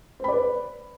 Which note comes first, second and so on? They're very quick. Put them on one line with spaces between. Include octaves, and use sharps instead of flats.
C5 B5 D5 B4